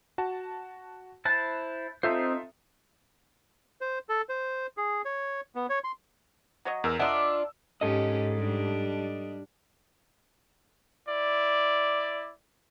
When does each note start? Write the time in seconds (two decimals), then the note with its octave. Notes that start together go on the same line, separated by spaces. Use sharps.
0.18 F#4 A5
1.25 E4 C5 A5 F#6
2.03 C4 D#4 F4 A4 C5 E5
3.81 C5
4.09 A4
4.29 C5
4.77 G#4
5.05 C#5
5.55 B3
5.69 C#5
5.84 C6
6.65 F#3 C#5 D#5
6.84 E2 A#4 E6
6.99 D4 F4 A#4 D#5 E5 F#5 D6
7.81 G#2 C#4 G4 A4 D#5
8.37 G3 D4
11.09 E4 D5